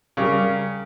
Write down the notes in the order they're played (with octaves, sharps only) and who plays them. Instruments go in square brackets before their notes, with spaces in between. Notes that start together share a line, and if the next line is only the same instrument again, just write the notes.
[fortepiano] C#3 G3 G4 A#4